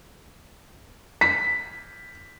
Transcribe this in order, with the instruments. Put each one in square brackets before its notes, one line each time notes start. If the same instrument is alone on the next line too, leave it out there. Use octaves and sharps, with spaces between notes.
[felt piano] B6